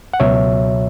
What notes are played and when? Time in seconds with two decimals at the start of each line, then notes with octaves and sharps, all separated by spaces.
0.14 F#5
0.20 C#2 B2 F#3 C#5 E5